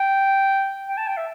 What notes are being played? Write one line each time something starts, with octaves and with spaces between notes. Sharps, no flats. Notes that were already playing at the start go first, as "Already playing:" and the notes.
Already playing: G5
G5
A5
G5
E5